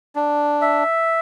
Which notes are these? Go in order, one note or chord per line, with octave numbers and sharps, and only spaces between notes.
D4
E5